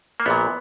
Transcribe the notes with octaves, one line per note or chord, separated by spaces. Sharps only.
A#3
A#1 A#2 B3